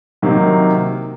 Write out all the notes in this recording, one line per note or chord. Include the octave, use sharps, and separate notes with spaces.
C3 D#3 F#3 A#3